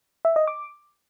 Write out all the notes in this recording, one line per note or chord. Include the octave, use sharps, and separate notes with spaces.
E5
D#5
D6